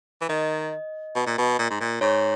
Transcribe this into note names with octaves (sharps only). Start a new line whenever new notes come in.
E3
D#3 D#5
B2
A#2
B2
A#2
G#2
A#2
G#2 C#5